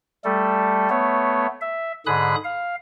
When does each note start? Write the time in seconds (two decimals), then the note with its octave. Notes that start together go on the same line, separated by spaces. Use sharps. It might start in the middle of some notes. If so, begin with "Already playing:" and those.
0.24 G3 A3 A4
0.90 A3 B3 C#5
1.61 E5
2.06 G#2 D3 G#4 B5 D#6 F#6
2.44 F5